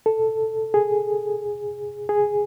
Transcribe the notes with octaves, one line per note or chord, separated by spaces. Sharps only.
A4
G#4
G#4